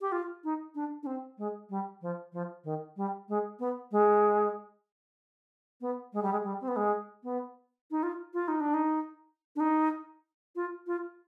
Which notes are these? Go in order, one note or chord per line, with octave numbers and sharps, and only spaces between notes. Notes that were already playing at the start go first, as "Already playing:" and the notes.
G4
F4
D#4
D4
D4
C4
G#3
G3
F3
F3
D#3
G3
G#3
B3
G#3
B3
G#3
G3
G#3
G3
C4
B3
G#3
B3
D#4
F4
F4
D#4
D4
D#4
D4
D#4
F4
F4